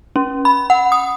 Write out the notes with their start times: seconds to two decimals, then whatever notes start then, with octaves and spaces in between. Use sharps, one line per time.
0.16 C#4
0.45 B5
0.70 F#5
0.92 D#6